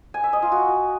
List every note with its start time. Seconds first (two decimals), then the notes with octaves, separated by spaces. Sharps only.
0.14 G#5
0.24 E5
0.33 D#5
0.42 F4
0.52 F#4